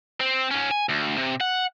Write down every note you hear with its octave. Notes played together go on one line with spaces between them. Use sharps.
C4
G#2 C#4
G#5
D2
C3
F#5